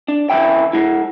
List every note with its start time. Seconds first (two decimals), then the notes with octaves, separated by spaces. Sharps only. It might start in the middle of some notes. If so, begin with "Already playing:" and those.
0.08 D4
0.30 C#2 C3 E3 E4 G5
0.73 G#3 E4